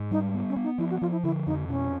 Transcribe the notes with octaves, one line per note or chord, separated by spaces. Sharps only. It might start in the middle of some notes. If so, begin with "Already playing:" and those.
Already playing: G#2
G3 D#4
B3
C#4
B3
D#4
F3 E4
F#4
F3 F4
E4
D3 E4
F2 D#4
B2 C#4